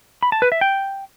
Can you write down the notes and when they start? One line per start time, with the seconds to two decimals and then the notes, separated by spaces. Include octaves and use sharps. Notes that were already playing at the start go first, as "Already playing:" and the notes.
0.23 B5
0.32 A5
0.42 B4
0.52 E5
0.61 G5